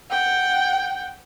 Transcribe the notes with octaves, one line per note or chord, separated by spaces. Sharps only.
F#5 G5